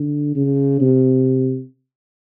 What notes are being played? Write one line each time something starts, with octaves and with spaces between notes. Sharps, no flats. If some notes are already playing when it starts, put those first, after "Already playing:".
Already playing: D3
C#3
C3